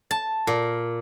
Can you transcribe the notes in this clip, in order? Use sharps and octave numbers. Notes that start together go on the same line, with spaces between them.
A5
A#2